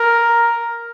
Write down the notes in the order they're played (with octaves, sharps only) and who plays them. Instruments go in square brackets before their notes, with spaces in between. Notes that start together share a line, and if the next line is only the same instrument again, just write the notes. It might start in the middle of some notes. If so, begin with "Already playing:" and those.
Already playing: [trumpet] A#4